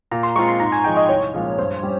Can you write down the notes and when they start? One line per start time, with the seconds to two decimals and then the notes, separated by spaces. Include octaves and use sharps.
0.11 A#2 A#5
0.23 C6
0.35 G#3 C4 F4 C#6
0.48 C6
0.60 G#2 A#5
0.72 G#5
0.84 F3 G#3 D#4 G5
0.97 D#5
1.09 C2 C#5
1.34 A#2 F3 G#3 C#4
1.58 G2 C5
1.83 G3 C#4